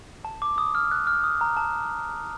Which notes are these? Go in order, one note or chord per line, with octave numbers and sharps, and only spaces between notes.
A5
D6
D#6
F6
F#6
F6
D#6
A#5
A5